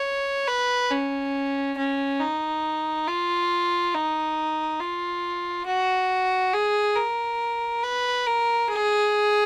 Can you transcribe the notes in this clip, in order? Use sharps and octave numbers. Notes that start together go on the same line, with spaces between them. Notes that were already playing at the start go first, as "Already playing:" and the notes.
Already playing: C#5
B4
C#4
C#4
D#4
F4
D#4
F4
F#4
G#4
A#4
B4
A#4
G#4